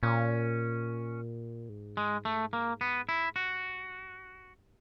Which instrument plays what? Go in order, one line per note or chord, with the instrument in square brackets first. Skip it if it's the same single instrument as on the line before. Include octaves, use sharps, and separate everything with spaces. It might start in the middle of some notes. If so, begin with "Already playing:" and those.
[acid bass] A#2 [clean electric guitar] C#4
[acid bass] G#2
[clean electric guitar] G#3
A3
A#3
B3
E4
[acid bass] G2 [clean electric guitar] F#4